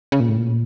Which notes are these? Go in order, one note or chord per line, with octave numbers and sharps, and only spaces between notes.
C#3
A#2
A2
A#2